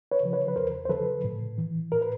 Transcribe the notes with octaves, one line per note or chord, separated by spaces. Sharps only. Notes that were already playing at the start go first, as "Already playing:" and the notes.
B4 C#5
C#3 F3
B4 C#5
B4
E2 A#4 C5
C5
C#3 F3 A4 B4
A2
E3
A2 A#4
B4